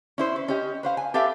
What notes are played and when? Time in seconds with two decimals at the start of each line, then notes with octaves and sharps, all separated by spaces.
0.18 C#4 E4 C5
0.36 B4
0.48 C#4 G4 D#5
0.83 B4 C5 F5
0.97 G#5
1.14 G4 A4 B4 E5 F5